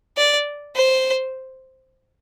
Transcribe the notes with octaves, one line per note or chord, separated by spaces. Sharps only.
D5
C5